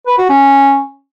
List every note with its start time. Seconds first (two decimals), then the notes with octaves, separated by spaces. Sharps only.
0.07 B4
0.18 F#4
0.29 C#4